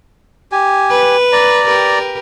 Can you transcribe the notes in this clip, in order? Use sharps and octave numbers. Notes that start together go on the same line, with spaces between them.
G4 G#5
B4
D5 A#5
G4 A#4 B4